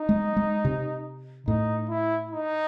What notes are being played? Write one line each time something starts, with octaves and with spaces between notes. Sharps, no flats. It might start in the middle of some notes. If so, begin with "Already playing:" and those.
Already playing: D#4
G#3
G#3
C3
A2 D#4
E4
D#4